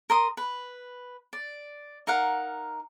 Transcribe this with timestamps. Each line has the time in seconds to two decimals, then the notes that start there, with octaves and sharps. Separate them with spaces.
0.10 A#4 C6 D#6
0.37 B4
1.33 D5
2.07 D#4 A#4 F5 F#5